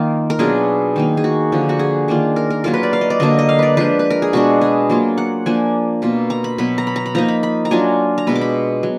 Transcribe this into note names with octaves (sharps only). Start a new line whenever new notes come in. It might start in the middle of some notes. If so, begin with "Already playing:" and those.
Already playing: D#3 A#3 F4
A#4
B2 F#3 D4 F4 G#4
D#3 A#3 D#4
G#4
F#4
D3 F3 A#3
F#4
G#4
D#3 A#3 D4 F4
A#4
A#4
F#3 A#3 F4 A#4
B4
D5
F5
D#5
D5
D3 F#3 A#3 D4 D#5
D#5
F5
B4 D5
F3 G#3 D4 B4
B4
A#4
G#4
B2 G#3 D4 F#4
G#4
F#3 A#3 F4
F#5
F3 A#3 D4 G#5
B2 A#3 F4
A#5
B5
B2 F#3 B3 B5
A#5
B5
A#5
B5
F3 A#3 D#4 A#5
B5
B5
A#5
F#3 D4 F4 G#5
A#5
B2 G#3 B3 B5
D6
B5
F#3